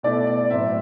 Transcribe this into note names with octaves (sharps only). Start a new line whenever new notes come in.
B2 A3 E4 D5
D5
A2 F#3 C4 E5